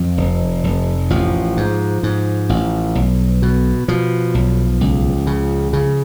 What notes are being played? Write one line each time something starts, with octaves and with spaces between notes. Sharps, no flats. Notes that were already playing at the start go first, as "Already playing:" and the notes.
Already playing: F2 F3
F1
F1
A1 F3
G#2
G#2
A1
B1
B2
B2 F3
B1
C#2
C#3
C#3